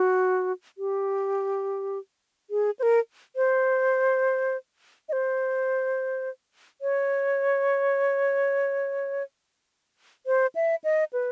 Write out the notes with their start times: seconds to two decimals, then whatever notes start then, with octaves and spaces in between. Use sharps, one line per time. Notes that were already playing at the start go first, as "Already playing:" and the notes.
Already playing: F#4
0.78 G4
2.50 G#4
2.79 C5
2.83 A#4
3.36 C5
5.09 D#5
5.13 C5
6.82 C#5
10.27 C5
10.55 E5
10.84 D#5
11.13 B4